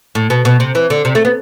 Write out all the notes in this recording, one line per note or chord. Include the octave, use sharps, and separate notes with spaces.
A2
B2
B2
C3
E3
D3
C3
A3
B3